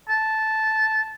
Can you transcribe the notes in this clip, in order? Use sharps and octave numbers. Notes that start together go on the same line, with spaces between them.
A5